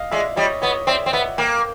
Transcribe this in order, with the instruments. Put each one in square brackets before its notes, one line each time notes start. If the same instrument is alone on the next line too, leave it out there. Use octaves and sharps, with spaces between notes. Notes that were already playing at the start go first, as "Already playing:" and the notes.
Already playing: [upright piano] D#5 F5
[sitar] G#3 [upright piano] D5 E5
[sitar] G3 [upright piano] C#5 D#5
[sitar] B3 [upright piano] C#5 D#5
[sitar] C4 [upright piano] D5 E5
[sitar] C4
[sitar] B3 [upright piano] E5 F#5
[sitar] A#3 [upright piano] F5 G5